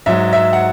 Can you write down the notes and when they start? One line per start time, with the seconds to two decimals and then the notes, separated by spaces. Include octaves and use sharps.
0.06 G#2 F#3 E5
0.33 E5
0.53 F#5